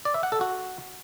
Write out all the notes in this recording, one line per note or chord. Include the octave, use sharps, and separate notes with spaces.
D5
E5
F#5
A4
F#4